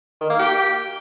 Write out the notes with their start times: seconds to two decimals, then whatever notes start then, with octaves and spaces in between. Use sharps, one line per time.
0.21 D#3
0.30 A#3
0.39 G4